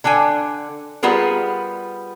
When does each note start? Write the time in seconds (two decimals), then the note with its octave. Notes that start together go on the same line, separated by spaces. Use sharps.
0.04 D3 D4 G5 G#5
1.03 G3 B3 F4 G#4 A#4